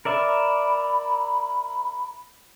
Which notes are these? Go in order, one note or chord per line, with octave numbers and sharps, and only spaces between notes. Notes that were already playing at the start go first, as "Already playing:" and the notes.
A#4 D5 E5 B5